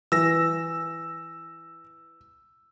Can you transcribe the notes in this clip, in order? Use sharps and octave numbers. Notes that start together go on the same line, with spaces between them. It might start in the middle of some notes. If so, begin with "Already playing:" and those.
E3 E6 A#6